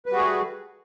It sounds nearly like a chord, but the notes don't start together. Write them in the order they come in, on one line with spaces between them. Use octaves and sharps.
B4 G3 F#4 G#4 A3